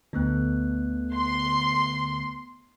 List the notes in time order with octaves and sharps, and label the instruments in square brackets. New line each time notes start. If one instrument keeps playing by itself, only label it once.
[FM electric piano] D2 D3 [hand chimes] A3 B3 F#6
[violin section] C6